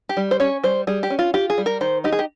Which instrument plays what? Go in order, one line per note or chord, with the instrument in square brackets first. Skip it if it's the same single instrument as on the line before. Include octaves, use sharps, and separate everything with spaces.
[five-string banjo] G4
G3
C5
C#4 C#5
G3 C5
G3 G#4
G4
C#4
F4
F4 G4
G#4
G3
A#4
D#3 C5
D#4 G4
G#4
G4